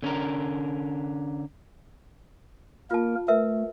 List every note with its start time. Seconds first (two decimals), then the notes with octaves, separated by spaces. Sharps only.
0.03 D3 C#4 D4 A#4
2.91 A#3 F4 A#4 A5
3.28 A3 A#4 B4 E5